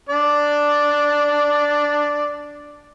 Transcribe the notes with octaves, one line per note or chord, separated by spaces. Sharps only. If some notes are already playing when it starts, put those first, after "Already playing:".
D4 D5